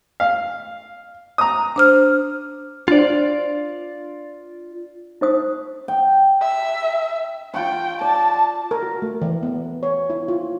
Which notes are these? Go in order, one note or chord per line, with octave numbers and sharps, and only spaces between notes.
F5
A#5 D#6
D4 C5 F6
D4 F4 C5 D5
D#4 C5 D#6
G5
E5
F4 G5 C#6
D5 A5
A#4
F#4
A3
E3
B3
C#5
E4
F4